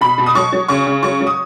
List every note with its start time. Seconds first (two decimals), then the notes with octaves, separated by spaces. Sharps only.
0.01 B2 B5
0.18 B2
0.26 D#6
0.35 F#3 C#6
0.53 F#3
0.68 C#3 C#6
0.87 C#3
1.03 F#3 C#6
1.20 F#3
1.27 D#6